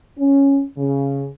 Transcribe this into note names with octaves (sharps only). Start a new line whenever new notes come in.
C#4
C#3